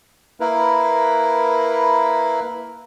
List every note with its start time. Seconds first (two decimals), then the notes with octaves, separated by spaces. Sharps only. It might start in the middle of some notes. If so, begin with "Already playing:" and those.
0.40 A#3 E4 A#4 B4